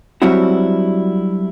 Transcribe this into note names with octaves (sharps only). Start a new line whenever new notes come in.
F#3 G3 C4 D4 E4 F#4